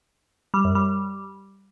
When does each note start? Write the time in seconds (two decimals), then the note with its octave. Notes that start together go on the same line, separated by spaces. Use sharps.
0.54 G3
0.64 F#2
0.75 G3